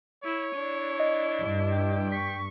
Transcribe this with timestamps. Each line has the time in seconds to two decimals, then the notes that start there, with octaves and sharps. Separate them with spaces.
0.24 E4 C#5
0.55 D4 E4
1.00 D#5
1.41 G2
1.72 G5
2.12 C#6 B6